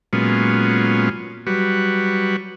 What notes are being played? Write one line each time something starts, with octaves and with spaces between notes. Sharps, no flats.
A#2 F#3 G#3 B3 C#4 F4
F#3 G3 F#4 B4